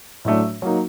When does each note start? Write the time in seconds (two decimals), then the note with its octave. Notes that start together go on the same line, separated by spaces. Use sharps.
0.25 A2 F#3 A3 D4
0.62 F#3 A#3 D#4